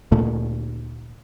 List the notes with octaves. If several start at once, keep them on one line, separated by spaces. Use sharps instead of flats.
D2 A#2 A3